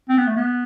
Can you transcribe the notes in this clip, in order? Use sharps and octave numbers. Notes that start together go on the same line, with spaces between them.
C4
B3
A3
B3